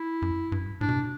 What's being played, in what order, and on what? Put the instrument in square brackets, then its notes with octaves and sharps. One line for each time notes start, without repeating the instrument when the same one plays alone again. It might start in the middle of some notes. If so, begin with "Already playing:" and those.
Already playing: [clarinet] E4
[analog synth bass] F#2
G2
F#2
G2
[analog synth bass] A2 [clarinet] D4
[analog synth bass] B2
C3